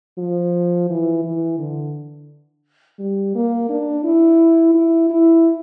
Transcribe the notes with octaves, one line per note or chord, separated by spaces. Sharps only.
F3
E3
E3
D3
G3
A#3
D4
E4
E4
E4